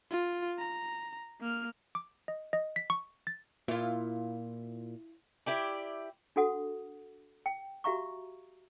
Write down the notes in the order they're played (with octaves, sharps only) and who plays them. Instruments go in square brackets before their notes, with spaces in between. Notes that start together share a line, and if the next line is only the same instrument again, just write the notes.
[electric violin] F4
A#5
A#3 F6
[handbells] D6
D#5
D#5
B6
C#6
A6
[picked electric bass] A#2 [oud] E4 F4
[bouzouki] E4 G4 D5
[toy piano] D4 F#4 A4 F#5 D#6
G5
F#4 G4 E5 F5 A#5 C#6